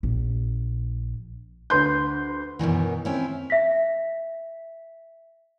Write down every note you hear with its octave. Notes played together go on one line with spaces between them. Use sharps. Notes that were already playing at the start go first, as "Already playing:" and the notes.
A#1
D2 B4 C6 G6
F#2 B2 D#3 E3
C4 C#4 E4
E5 A#6 B6